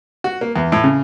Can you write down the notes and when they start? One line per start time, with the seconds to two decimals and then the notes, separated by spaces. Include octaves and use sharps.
0.24 F#4
0.41 A#3
0.56 E2
0.72 A2
0.84 C#3